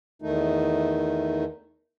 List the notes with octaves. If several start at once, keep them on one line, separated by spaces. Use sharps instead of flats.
E2 D#3 A3 D#4